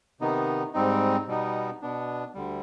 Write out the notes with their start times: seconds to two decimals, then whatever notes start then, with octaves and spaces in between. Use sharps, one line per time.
0.20 C3 D#3 B3 D#4
0.73 G#2 G3 C4 D#4
1.28 B2 G3 B3 D#4
1.82 B2 B3 D4
2.34 D2 D3 G3